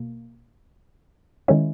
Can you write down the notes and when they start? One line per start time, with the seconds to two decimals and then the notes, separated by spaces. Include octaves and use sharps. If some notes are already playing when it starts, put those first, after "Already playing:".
Already playing: B2 A#3
1.48 D#3 G#3 C#4 E4